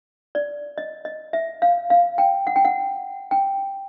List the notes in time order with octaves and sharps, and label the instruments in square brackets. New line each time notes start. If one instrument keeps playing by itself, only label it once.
[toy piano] D5
D#5
D#5
E5
F5
F5
G5
F#5
G5
F#5
G5